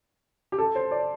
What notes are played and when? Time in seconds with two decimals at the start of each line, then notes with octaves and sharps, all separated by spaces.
0.52 G4
0.58 A4
0.75 C5
0.91 D5